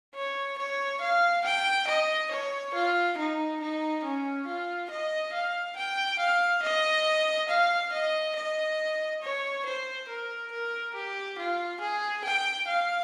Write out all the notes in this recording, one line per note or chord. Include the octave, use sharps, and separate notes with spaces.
C#5
C#5
F5
G5
D#5
C#5
F4
D#4
D#4
C#4
F4
D#5
F5
G5
F5
D#5
F5
D#5
D#5
C#5
C5
A#4
A#4
G4
F4
G#4
G5
F5